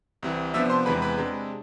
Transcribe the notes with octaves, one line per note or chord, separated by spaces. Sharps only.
C2 C3 E3
C3 F3 B3 D4 E5 E6
C5 C6
E2 C3 E3 G#3 B4 B5
B4 B5
C3 G#3 D4